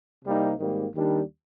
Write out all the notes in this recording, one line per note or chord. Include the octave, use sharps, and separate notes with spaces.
C2 C3 G3 A#3 D#4
G#1 G#2 D#3 G3 A#3
D#2 D#3 G3 D4